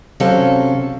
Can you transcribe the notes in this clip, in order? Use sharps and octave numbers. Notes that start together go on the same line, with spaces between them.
C3 F#3 C#4 A4 C5 F5